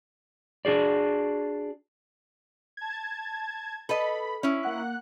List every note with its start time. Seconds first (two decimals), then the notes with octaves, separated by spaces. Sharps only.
0.65 D4 F#4 G#4 D5
2.77 A5 G#6
3.89 A4 B4 D#5 B5
4.43 C#4 E4
4.63 A#3 F#5 F#6